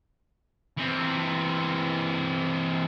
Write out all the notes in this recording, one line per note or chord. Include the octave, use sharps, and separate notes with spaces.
E3 C4